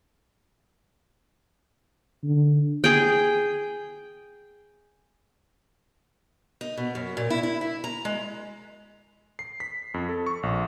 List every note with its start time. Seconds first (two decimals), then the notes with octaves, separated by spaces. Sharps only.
2.24 D3
2.84 G#4 G5
6.61 D#4
6.77 B2
6.95 F#2
7.17 A#2
7.30 E4
7.43 E4
7.61 E4
7.84 A#5
8.05 G#3
9.39 C7
9.60 B6
9.94 F2
10.09 A4
10.27 C#6
10.43 A#1